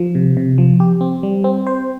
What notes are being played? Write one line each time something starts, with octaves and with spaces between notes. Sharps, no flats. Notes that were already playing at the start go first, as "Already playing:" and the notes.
Already playing: F3
C3
C3
F3
G4
C4
G3
C4
C5